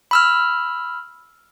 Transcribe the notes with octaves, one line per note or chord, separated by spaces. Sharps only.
B5 E6 F6